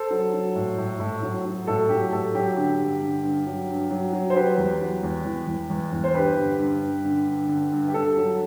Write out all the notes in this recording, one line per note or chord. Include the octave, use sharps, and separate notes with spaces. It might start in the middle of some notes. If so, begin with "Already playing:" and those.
Already playing: A4 C5
F#3
F#3
A2
A2
A2
F#3
F#3
A2 A4
F#3 G4
A2 A4
F#3 G4
D3 G4
G2
D3
G2
F#3
G2
F#3
F#3
C5
F#3 G4 B4
E2
F#3
E2
E2
E2
E2
E2
C5
G2 G4 B4
D3
G2
G2
D3
G2
D3
G2
G4
G2 A4
F#3